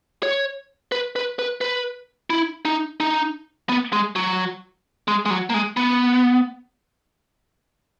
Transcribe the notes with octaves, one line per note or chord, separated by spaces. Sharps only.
C#5
B4
B4
B4
B4
E4
D#4
D#4
B3
G#3
F#3
G#3
G#3
F#3
A#3
G#3
B3